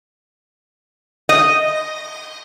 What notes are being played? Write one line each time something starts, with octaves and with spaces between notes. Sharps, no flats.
D#5